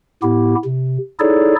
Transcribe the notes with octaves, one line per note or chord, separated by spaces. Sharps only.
A2 B3 E4 G4
C3
D#4 E4 G#4 A4 C#5 D5